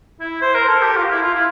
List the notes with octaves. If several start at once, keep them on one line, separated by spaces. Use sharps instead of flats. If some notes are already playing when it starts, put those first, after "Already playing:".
E4
C5
A#4
A4
G4
F4
E4
F4
E4